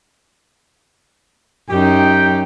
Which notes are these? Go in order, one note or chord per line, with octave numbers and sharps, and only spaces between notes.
F#2 D#4 G4 G5